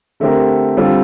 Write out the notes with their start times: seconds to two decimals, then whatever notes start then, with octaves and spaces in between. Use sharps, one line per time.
0.20 D3 A3 C4 G4 A#4
0.77 D3 G3 C4 F4 A4